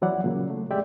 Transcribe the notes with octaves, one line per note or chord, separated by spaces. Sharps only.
E2 E3 F#3 E4 D5 F#5
A#2 C#3 F#3
A3
F2 G#3 G4 D5 E5 G5